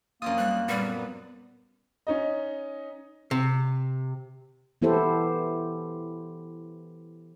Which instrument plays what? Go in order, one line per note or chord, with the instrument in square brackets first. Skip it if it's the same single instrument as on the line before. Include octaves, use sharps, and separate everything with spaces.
[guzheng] F#2 C4 F4 [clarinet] A#3 [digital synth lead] D#6
[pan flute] G3 [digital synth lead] F#6
[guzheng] A#2 [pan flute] G3 [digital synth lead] B3
[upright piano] C#4 D#4 D#5
[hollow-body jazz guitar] C3
[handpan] E3 B3 E4 G4 A4 C5